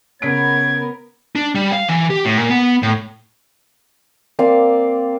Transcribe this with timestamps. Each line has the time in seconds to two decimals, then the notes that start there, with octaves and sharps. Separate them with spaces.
0.22 C#3 B3 A#4 C#5 G#6 B6 D7
1.36 D4
1.55 G3
1.72 F5
1.88 E3
2.10 G4
2.25 A2
2.37 A#2
2.49 B3
2.83 A2
4.39 A#3 C4 D5 F5